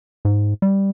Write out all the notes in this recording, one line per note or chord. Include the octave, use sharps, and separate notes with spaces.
G#2
G3